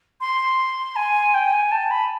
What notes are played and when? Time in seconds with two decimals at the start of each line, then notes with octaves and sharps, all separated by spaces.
0.20 C6
0.96 G#5
1.34 G5
1.53 G#5
1.71 A5
1.90 B5